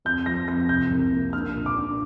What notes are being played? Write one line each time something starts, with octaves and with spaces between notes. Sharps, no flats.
F2 G6
F3 A#6
F2 A#6
C3 G6
C2
A#3
D4 F6
A#2
D6
D4